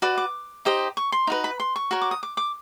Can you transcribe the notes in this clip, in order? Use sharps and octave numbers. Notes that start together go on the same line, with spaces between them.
F#4 B4 D5 D6
D6
D#4 G4 C5 D#5
C#6
C6
D#4 F#4 B4
B5
C6
C#6
F#4 A#4 C#5
D6
D#6
D6
D6